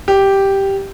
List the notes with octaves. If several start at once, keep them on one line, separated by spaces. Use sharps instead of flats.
G4